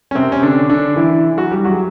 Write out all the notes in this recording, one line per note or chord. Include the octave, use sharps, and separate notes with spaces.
C#4
C3 C4
C#4
D3 D4
D3 D4
E3 E4
F#3 F#4
G3 G4
F#3 F#4
G#4